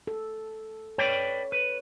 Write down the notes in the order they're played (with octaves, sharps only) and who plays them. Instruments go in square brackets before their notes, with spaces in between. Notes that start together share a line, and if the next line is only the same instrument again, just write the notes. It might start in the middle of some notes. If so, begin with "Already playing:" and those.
[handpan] A4
[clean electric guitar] B4 D5 G5 [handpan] C#5
[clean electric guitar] B4